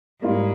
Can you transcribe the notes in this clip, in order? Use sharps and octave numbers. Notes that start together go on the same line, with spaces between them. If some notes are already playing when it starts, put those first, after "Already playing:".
G#2 G3 A#3 F4